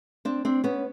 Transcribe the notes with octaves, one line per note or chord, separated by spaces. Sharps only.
C4 D4
C4 D4
B3 C#4